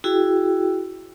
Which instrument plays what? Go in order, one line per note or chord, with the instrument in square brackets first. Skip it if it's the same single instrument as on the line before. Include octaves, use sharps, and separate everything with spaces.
[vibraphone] E4 F#4 G#4 G5